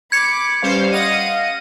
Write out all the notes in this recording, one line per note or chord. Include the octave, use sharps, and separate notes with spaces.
B5 D6 G#6 C#7
G3 C#4 B4 C5 F5
D#5 F5 F#5 D#7